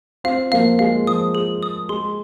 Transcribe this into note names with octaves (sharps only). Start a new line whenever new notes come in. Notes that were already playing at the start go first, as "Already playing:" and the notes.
C4 F4 F5
F3 A#3 F5
G#3 F5
F3 D#6
G#4
D#6
G#3 C6